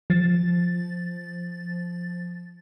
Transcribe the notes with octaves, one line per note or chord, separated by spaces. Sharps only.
F3 A6